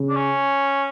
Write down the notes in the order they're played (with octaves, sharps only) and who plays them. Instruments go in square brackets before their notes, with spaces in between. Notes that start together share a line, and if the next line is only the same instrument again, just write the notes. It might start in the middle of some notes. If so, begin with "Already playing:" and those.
Already playing: [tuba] C#3
[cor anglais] D4
C#4